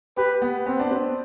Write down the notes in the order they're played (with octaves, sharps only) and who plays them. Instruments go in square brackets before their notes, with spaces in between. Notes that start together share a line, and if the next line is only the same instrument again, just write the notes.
[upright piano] G4 [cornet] B4
[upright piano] B3
[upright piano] B3 [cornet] C4
[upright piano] D4
C4